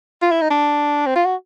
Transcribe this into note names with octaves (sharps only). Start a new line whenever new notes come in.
F4
E4
D#4
D4
C4
F4
F#4